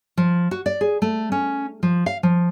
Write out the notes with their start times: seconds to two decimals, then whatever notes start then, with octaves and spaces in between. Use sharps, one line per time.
0.17 F3
0.51 F#4
0.66 D5
0.81 G#4
1.02 A3
1.32 C#4
1.83 F3
2.06 F5
2.23 F3